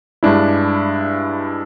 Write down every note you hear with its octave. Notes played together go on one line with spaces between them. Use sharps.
G2 G#3 D4 E4